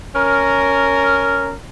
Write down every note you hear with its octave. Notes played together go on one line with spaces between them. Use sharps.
C#4 A#4